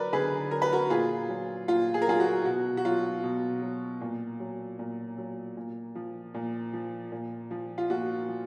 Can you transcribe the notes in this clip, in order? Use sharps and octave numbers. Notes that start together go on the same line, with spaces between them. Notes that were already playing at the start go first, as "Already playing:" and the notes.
Already playing: D3 F#3 A#4 B4 D5
D3 G#4 B4
F#3 A#4
B4
F#4 A#4
A#2 F4 G#4
F#3
A#2 F4
G#4
A#4
F#3 F4 G#4
F#4
B2 F#4
F#4
F#3 F4
B2
F#3
A#2
F#3
A#2
F#3
A#2
F3
A#2
F3
A#2
F3
F4
A#2 F#4
F3